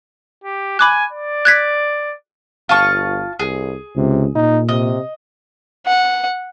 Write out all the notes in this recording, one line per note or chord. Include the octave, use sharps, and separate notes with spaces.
G4
G#5 B5 D6 F#6
D5
F#6 G#6 B6
G1 F4 A5 C#6
C2 G#4
C#2 C3
A#2 D#4
C3 D#5
F#5